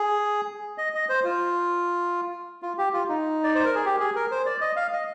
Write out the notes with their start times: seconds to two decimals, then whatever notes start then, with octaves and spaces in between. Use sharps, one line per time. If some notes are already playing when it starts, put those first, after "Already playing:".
Already playing: G#4
0.78 D#5
0.94 D#5
1.09 C5
1.24 F4
2.62 F4
2.78 G4
2.93 F4
3.09 D#4
3.44 D5
3.55 C5
3.65 A#4
3.75 G#4
3.85 G4
4.00 G#4
4.15 A#4
4.31 C5
4.46 D5
4.61 D#5
4.76 F5
4.93 D#5